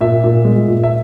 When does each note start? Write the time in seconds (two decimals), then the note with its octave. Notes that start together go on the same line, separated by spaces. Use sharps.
0.01 A#2 E5
0.24 A#2
0.45 G#3
0.68 A#2
0.83 E5